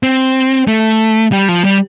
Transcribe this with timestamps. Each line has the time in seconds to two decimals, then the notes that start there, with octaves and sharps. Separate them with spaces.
0.03 C4
0.68 A3
1.32 G3
1.49 F3
1.64 G3